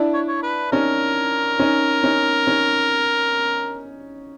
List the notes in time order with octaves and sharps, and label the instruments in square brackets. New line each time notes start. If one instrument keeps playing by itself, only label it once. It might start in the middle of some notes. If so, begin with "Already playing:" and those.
Already playing: [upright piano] D4 E4
[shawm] C#5
C#5
B4
[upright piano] C#4 D#4 [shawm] A#4
[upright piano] C#4 D#4
C#4 D#4
C#4 D#4